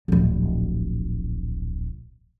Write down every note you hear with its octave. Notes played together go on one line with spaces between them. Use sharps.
D1 A#1